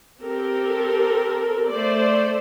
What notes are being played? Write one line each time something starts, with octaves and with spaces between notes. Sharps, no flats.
C4 G4 A4 A#4
A3 C5 D5